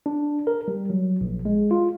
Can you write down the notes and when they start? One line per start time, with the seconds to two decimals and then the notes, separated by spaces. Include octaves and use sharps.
0.06 D4
0.47 A#4
0.68 G3
0.90 F#3
1.21 A#1
1.45 G#3
1.71 F4